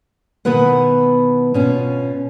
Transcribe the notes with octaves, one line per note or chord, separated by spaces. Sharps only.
B2 D#3 B3 E4 B4 F#5
B2 C#4 F4